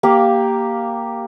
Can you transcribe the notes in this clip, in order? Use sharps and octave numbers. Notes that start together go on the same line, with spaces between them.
A#3 G4 F5